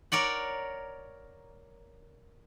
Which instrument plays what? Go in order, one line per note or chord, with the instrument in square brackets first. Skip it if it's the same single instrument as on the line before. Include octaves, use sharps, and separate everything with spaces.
[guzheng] A#4 C#5 D5 F#5